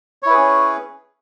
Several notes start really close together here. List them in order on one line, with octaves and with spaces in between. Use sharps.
C#5 E4 B4 G#4 C#4